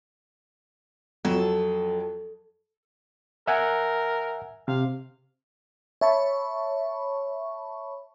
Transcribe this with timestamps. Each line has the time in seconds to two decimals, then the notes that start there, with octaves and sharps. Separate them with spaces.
1.25 F2 F#3 A4
3.47 A#4 E5 F#5 G#5
4.68 C3 F5
6.01 C#5 E5 A5 B5 C#6